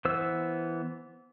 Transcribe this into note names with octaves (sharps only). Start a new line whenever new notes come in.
E3 B3 C5 E6